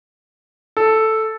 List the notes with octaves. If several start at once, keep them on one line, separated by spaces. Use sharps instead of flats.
A4